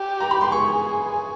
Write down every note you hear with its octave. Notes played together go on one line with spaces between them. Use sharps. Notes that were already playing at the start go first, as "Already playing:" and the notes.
Already playing: G4
A#5
B5
C6
G#4 C#6